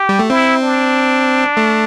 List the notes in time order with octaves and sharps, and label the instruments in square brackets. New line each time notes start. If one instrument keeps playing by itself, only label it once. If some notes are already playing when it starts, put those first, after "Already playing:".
Already playing: [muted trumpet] G4
[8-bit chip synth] G3
A3
[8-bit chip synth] C4 [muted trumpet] E4
[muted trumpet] D4
[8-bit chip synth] A3